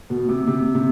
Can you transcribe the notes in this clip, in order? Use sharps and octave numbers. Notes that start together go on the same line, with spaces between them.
B2
C3
C3
C3